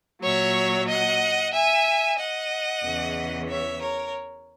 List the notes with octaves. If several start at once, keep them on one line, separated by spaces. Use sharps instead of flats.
A#2 F#3 C#5 E5
D#5 F#5
E5 G#5
D#5 F#5
E2 C#3 E3
C#5 E5
A#4 C#5